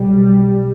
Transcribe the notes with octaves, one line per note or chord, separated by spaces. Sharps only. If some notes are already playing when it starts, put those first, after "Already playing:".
Already playing: B1 B2 G3